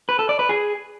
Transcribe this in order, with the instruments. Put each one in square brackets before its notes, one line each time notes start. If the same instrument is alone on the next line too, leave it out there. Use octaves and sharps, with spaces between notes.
[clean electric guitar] B4
A4
D5
B4
G#4